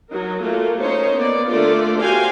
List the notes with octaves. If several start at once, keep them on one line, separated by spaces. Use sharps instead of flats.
F#3 D#4 A#4
A3 A#3 F4 F#4
C#4 D#4 C5 C#5
A#3 B3 D5
D3 A3 A#3 F4 D5
F#4 G4 C5 F5 G5 G#5